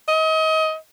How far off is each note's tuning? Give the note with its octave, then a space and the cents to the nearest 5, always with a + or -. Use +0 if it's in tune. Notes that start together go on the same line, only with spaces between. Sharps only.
D#5 +30